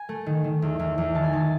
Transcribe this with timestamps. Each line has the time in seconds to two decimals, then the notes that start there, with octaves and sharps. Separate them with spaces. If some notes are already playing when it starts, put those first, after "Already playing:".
Already playing: G#5
0.09 A3
0.26 D#3
0.44 D#3
0.62 E2
0.79 E2
0.98 E2
1.15 D#3 A5
1.23 G#5
1.33 D#3 A5